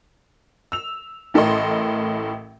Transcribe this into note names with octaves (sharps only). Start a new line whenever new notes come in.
E6 F7
A1 A2 A4 A#4 D#5 C6